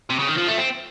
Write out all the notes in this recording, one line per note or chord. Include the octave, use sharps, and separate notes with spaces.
C3
C#3
D#3
F3
A3
C4